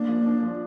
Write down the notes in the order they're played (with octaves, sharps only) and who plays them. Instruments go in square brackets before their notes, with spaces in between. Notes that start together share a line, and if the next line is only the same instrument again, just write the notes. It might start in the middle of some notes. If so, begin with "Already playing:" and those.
Already playing: [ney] A#3 [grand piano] D4
[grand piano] F3
D4
F3